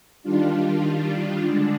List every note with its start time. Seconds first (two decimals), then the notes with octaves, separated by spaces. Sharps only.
0.23 D#3 G3 D4 F4
1.44 D3 G#3 D4